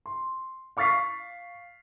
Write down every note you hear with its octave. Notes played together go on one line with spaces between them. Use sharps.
C6
F5 C#6 F6 A6 B6 C7